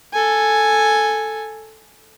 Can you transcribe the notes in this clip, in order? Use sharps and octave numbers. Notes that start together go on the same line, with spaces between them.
A4 G#5